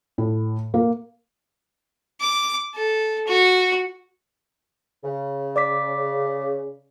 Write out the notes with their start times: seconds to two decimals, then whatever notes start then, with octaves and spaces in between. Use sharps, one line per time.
0.18 A2
0.74 A#3
2.21 D6
2.74 A4
3.27 F#4
5.04 C#3
5.56 D5 D6 B6